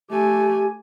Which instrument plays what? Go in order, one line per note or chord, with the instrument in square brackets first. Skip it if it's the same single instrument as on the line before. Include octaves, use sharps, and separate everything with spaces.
[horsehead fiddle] A3 G#5 [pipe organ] G4